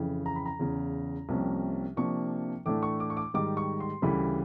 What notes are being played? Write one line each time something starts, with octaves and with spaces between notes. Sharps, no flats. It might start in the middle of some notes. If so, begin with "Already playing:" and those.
Already playing: F2 C#3 E3
A#5
B5
A#5
E2 C#3 E3
C2 C3 F3 A#3 C#4
C3 F3 A#3 D4 C#6
A2 E3 A3 D4 D6
C#6
D6
C#6
D6
G#2 D#3 G3 D6
C#6
C6
D2 C#3 E3 G3 B5